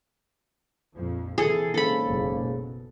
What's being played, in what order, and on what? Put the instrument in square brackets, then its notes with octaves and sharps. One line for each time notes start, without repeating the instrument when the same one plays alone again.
[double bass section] A#1 F2 F3
[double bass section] C3 E3 [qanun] G#4 A4
[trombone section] G#2 C#3 A#3 [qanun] A4 B5
[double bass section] F#1 B1 E2
B2